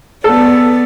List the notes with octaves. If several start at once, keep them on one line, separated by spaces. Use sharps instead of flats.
B3 A4 D5